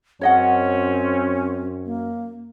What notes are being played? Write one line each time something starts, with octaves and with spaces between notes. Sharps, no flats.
F#2 C4 C#4 C#5 D#5 F#5
A#3